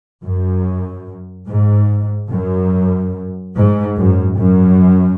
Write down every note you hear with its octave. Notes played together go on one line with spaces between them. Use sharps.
F#2
G#2
F#2
G#2
F#2
F#2